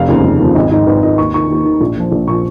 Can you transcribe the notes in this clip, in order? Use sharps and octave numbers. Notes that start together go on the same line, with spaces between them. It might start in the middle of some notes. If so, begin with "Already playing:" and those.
Already playing: F1 F5
D#2 C#3 F3
F1
D#2 C#3 F3
G#1 D#5
G#2 D#3 D#5
G#1 B4
G#2 D#3 D#5
D#2 C#6
D#3 C#6
D#2
D#3
A#1
A#2 F3
A#1
A#2 F3 C#6